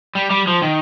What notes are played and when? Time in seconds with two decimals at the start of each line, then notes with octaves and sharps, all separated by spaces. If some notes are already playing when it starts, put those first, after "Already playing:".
0.15 G3
0.30 G3
0.47 F3
0.62 D#3